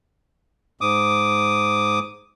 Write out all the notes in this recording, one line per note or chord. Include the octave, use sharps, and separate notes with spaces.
G#2 D6 D#6